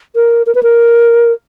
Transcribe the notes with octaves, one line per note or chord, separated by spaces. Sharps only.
A#4
A#4
B4
A#4